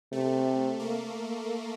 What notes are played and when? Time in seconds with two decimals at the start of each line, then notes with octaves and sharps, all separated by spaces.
0.12 C3 A3
0.80 A#3